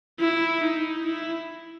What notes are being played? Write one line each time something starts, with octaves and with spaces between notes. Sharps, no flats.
E4
D#4
E4